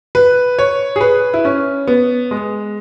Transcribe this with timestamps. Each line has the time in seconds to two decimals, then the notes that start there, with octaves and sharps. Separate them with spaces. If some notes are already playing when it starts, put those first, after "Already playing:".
0.15 B4
0.59 C#5
0.96 G#4
1.01 B4
1.34 E4
1.45 C#4
1.87 B3
2.31 G#3